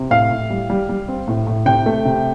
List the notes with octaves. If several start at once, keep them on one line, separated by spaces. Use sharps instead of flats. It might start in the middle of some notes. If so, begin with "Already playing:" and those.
Already playing: C3
A2 F5
A2
G3
G3
G3
C4
A2
A2
C3 G5
A3
C3